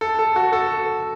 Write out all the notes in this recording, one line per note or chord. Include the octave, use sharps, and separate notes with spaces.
A4
A4
F#4
A4